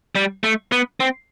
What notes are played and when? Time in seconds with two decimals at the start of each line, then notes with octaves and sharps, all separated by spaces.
0.15 G3
0.44 A3
0.72 B3
1.00 C4